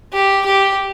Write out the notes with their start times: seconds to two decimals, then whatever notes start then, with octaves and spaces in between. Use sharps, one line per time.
0.13 G4
0.45 G4